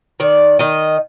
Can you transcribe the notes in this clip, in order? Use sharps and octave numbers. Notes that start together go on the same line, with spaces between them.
D#3 D5
D#3 D#5